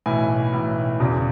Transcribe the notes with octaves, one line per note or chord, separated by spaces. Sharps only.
B1 A2 E3 G#5
B1 A2 E3
E1 E2 C#3 F#3